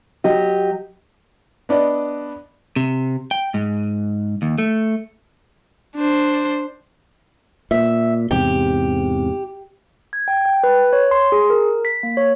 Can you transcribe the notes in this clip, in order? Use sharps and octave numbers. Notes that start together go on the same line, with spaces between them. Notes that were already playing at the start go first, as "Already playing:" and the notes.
F#3 G4 D#5
B3 D4 D5 D#5
C3
G5
G#2
D#2
A3
D4 C5
A#2 E5
E2 G#2 C3 G4
G#6
G5
G5
B4
C#5
C6
G#4
A#4
B6
A#3
C#5